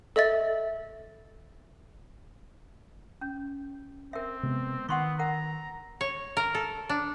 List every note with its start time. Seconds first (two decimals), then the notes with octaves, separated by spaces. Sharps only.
0.16 A4 D#5 E5 A6
3.21 C#4
4.13 C4 A#4 E5
4.43 C3 G#3 B3
4.89 D#3 B3 F#5 C6 C#6
5.19 A#4 F#5 A#5
6.01 C#5
6.37 A#4
6.55 A4
6.89 D4